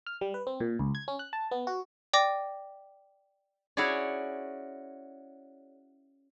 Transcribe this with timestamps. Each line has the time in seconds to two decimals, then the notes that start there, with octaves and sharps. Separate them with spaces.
0.07 F6
0.21 G3
0.34 B4
0.47 C4
0.60 A#2
0.79 C#2
0.95 G#6
1.08 C#4
1.19 F#6
1.33 A5
1.51 B3
1.67 F#4
2.13 D5 G5 D6 A#6
3.77 C#4 E4 F#4 G#4 C#5 D5